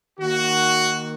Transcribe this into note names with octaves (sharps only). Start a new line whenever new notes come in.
D#3 A#3 F#4